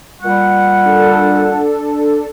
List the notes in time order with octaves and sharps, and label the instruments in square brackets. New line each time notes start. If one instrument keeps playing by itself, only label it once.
[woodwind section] A#2 G3 F#5
[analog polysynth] D4 A4